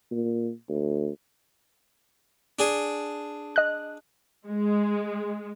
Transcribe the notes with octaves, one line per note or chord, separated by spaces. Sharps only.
A#2
D2
D4 G#4
D#5 F#6
G#3